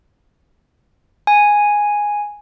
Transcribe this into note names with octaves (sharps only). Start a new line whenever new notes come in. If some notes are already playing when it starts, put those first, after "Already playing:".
G#5